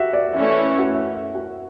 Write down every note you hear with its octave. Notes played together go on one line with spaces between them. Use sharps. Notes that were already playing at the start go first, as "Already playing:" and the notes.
Already playing: F#4 G4 E5 F#5
D5
E3 A3 C#4 E5
E5
F#4 F#5
E5
E5
F#4 F#5